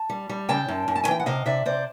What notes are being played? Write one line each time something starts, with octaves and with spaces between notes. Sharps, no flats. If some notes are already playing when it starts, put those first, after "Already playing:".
Already playing: A5
G3
G3
C#3 G5 A5
F#2
F#2
A5
G#5
E3 G5
F#5
C3 D#5 F5
C3 D5 E5
C3 C5 D5